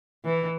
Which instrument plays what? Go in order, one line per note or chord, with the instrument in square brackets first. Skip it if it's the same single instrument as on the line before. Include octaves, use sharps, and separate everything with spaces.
[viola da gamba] E3